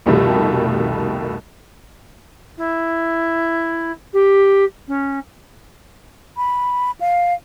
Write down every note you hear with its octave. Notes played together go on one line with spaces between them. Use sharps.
C2 F2 B2 D#3 G3 A3
E4
G4
C#4
B5
F5